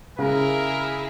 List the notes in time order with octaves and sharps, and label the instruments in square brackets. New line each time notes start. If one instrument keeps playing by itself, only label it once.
[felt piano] C#3 [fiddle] E4 G#4 [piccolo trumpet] A#4